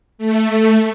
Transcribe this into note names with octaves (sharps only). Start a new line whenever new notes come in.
A3